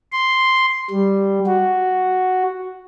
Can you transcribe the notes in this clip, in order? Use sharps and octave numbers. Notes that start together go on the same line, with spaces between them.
C6
G3
F#4